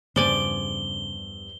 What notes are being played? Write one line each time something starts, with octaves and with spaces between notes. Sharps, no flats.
E2 G2 C#3 F3 D5 G#5 G7